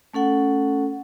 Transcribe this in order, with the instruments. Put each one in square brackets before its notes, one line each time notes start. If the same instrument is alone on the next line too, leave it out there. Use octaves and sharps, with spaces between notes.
[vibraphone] A3 C#4 A4 F#5